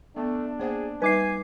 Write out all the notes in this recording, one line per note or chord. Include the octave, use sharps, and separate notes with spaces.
A3 B3 D4
A#3 G#4 C5 F#5
G3 D#4 B4 E5 G#5 D6 C7